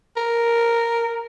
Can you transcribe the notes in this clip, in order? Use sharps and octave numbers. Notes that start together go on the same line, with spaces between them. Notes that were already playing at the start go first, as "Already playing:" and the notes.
A#4